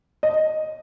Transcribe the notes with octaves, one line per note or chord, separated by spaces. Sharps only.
D#5